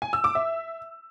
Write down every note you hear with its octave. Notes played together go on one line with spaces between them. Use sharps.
G#5
E6
D6
E5